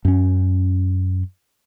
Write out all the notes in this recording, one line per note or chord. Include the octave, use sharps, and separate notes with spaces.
F#2 C#4